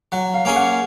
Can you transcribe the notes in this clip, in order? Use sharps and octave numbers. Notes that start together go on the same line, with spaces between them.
F#3 F#5
F5
A#3 C#4 G#4 G#5
F#5